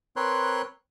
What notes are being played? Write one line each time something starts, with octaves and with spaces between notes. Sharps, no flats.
C4 A#4 B4 C#5 C6 F#6